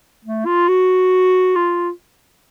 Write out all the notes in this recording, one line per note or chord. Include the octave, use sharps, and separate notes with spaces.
A3
F4
F#4
F4